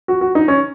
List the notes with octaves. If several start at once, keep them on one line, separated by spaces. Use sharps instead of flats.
F#4
F#4
D#4
C#4